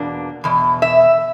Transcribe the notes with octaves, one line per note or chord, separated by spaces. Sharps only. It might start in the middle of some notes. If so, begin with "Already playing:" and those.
Already playing: E2 B2 A#3 D4
E2 B2
E5